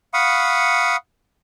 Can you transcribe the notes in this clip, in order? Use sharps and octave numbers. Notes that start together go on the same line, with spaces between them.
F5 F#5 B5 C#6 D#6